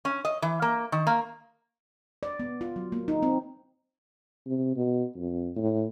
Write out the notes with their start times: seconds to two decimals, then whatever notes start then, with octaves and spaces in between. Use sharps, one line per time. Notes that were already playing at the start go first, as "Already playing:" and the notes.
0.05 C#4
0.25 D#5
0.42 E3
0.62 A#3
0.92 D#3
1.07 A#3
2.23 D5
2.40 B3
2.61 F4
2.76 F#3
2.92 A#3
3.08 D#4
3.23 C4
4.46 C3
4.76 B2
5.16 F2
5.56 A2